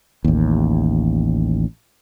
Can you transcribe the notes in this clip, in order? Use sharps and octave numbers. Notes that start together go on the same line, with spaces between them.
A1 D#2